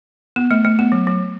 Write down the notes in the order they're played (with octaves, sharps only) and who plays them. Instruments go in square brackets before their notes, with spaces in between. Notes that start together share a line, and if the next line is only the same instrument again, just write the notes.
[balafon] B3
A3
A3
B3
F#3
F#3